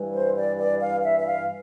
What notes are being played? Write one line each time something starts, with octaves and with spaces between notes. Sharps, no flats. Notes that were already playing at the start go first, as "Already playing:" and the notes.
Already playing: G2 E3 G3
C5
D5
D5
F5
E5
E5
F5